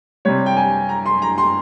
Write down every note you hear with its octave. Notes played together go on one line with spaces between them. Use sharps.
C3 G3 C#5
G5
G#5
A#5
C6
A#5
C6